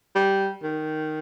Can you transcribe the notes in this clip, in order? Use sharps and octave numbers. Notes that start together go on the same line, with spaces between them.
G3
D#3